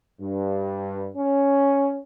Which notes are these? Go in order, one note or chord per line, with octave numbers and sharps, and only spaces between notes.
G2
C#4